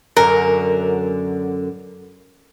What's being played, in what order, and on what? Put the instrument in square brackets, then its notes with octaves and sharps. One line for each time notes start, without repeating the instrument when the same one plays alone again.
[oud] F#2 D3 [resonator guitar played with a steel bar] A#4